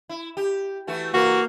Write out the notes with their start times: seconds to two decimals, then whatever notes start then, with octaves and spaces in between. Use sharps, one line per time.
0.09 E4
0.37 G4
0.87 E3 A3 F#4
1.14 E3 A#3 F#4 A#4 F5